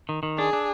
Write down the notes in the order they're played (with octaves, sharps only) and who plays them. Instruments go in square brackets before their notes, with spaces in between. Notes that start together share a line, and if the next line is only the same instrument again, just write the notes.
[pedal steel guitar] D#3
D#3
[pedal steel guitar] D4 [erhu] G#4
[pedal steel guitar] D4